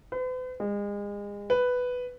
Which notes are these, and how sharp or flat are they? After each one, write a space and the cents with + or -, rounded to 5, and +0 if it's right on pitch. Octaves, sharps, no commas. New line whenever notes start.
B4 +45
G#3 -35
B4 +5